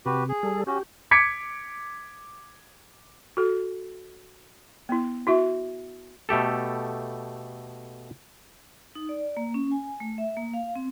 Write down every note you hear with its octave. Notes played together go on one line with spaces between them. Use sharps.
C3 F#4 G4 B4
G#4
G3 A4
C#4 F#4 G4
D6 G#6 B6 C#7 D7
F#4 A4
B3 E4
E4 F#4 E5 C#6
B2 A3 G4 A4
D#4
D5
A#3
C#4
G#5
A3
E5
A#3
F5
C4